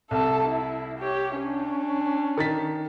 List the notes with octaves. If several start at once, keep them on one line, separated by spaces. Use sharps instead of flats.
C2 A4 A5
E4
G4 C#5
C#4 D4
D#3 A6 B6